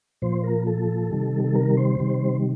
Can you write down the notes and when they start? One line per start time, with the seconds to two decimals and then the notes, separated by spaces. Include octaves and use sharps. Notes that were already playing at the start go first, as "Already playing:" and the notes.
0.22 A#2 F3 C5
0.44 A#4
0.67 A4
1.11 C3 D#3 G3
1.44 A4
1.55 A#4
1.77 C5
1.99 C3 D#3 G3